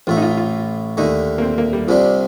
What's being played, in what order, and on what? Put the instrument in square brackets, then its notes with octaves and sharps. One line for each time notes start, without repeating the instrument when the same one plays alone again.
[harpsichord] A1 A2 A3 [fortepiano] F4
[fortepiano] D#4
F4
F4
[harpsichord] D#2 D3 A3 [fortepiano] D#4
[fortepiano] A#3
C4
A#3
G3
[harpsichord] C2 C3 G3 D4 [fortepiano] F3